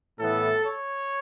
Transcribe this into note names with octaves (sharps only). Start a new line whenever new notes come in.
A2 E3 B3 A4
C#5